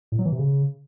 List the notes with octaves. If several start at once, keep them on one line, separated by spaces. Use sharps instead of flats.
A2
F#3
E3
C3
C#3